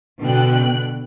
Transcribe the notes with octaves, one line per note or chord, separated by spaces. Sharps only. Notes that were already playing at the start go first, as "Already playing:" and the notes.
B2 D3 G5 F#6